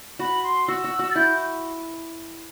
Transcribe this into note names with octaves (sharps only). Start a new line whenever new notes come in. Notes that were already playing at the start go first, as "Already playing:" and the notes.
F#4 B5
C6
F#4 E6
F#4
F#4
A6
E4 G6